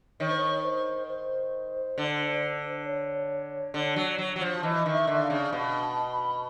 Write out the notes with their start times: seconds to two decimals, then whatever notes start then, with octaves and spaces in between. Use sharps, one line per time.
0.20 D#3 C#5
0.29 C5
0.38 C#5
0.63 C5
1.09 C5
1.98 D3
2.85 C#5
3.74 D3
3.96 F#3
4.18 F#3
4.36 F#3
4.41 F3
4.63 E3 D#5
4.86 D#3
4.93 E5
5.07 D3
5.23 F5
5.30 C#3
5.53 B2
5.81 A5
6.12 B5